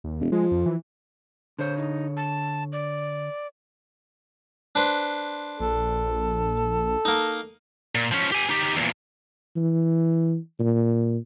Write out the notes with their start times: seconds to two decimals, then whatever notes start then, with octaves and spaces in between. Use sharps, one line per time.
0.04 D#2
0.20 E1
0.32 F3 G#3
0.51 F2
0.66 E3
1.59 D3 C5 C#5
1.77 D#4
2.17 A5
2.73 D5
4.75 D4 B4 C5
5.60 A#1 A4
7.05 A#3 D#4
7.95 A#2
8.12 F3 C#4
8.32 G4 G#5
8.49 D#4 G4
8.76 E2 A#2
9.56 E3
10.60 A#2